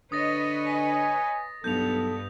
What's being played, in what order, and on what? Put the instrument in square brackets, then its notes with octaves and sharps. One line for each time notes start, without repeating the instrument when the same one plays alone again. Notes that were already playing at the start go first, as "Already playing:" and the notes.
[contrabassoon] D3 [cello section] B4 C#5 D#5 [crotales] D#6 A6 A#6
[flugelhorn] G#5 [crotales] B6
[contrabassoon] B1 [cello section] G2 B3 [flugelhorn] A4 [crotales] G6 F7